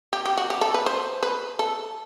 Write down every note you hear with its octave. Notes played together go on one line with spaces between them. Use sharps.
G4
G4
F#4
G4
A4
B4
C5
B4
A4